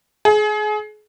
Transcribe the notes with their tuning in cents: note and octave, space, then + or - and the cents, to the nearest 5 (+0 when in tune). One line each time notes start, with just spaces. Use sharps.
G#4 +30